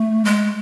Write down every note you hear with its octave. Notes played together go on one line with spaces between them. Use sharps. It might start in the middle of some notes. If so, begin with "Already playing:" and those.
Already playing: A3
G#3